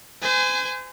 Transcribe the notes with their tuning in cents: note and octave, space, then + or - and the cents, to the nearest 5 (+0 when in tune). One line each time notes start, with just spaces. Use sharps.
C5 -40 G#5 -10